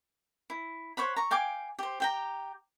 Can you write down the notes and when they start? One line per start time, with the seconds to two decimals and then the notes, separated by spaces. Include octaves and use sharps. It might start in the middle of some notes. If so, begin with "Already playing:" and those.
0.50 E4
0.97 C5 C#5 F#5 B5
1.16 A#5 C#6
1.31 F5 G5 G#5 D6
1.79 G4 C5
2.00 G4 G5 A#5